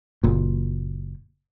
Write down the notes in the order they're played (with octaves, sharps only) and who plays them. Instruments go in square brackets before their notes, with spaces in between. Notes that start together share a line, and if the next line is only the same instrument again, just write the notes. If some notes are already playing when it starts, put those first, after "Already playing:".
[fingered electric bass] F#1 A#2